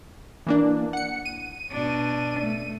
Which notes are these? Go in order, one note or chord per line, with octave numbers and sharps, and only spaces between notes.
E3 A#3 D4
F#5 C#7
D#7
B2 D4
A3